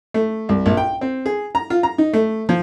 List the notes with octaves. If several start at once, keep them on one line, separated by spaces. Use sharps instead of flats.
A3
C2
A#1
G5
C4
G#4
A#5
F4
A#5
D#4
A3
F3